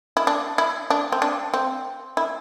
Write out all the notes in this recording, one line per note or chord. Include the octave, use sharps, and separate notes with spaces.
E4
D4
E4
D4
C4
D4
C4
E4